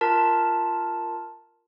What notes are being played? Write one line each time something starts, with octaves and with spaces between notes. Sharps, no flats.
F4 A#4 A5